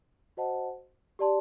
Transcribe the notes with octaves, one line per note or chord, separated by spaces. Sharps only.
F#4 C5 D#5 F#5 A5
G4 D5 A5 C6